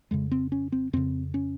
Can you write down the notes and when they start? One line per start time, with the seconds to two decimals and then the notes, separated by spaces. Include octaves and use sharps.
0.11 F2 C#3 G#3
0.31 C4
0.52 C#4
0.72 C4
0.93 F2 C#3 C4
1.34 C#4